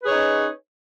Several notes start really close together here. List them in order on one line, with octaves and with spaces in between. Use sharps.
B4 G#4 C#5 D#4 C#4